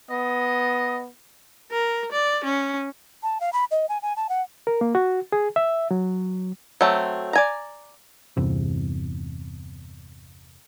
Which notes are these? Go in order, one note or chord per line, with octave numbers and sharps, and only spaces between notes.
B3 D#5
A#4
D5
C#4
A5
F5
B5
D#5
G#5
G#5
A5
F#5
A#4
A#3
F#4
G#4
E5
F#3
F#3 A3 C4
D5 G#5 A#5
G1 E2 C3